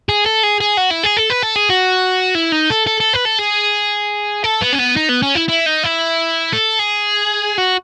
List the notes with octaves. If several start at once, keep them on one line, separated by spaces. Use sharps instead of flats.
G#4
A4
G#4
G#4
F#4
E4
G#4
A4
B4
A4
G#4
F#4
E4
D#4
A4
A4
A4
B4
A4
G#4
A4
B3
C#4
B3
D#4
B3
C#4
E4
E4
D#4
E4
A4
G#4
F#4